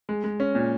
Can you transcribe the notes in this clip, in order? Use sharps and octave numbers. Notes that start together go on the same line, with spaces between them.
G#3
G#3
C#4
A#2